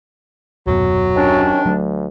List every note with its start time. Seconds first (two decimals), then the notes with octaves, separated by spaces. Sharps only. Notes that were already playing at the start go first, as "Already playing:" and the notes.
0.67 D#1 F#2 B2 F#3
1.16 C3 D#3 C#4 D4
1.66 D2 F#3 A3